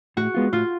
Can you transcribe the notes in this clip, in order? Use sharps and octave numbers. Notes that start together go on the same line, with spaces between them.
A2 F#4
G#3 B3 F4
A2 F4